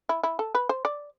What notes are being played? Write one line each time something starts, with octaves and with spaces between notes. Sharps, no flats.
E4
E4
A4
B4
C5
D5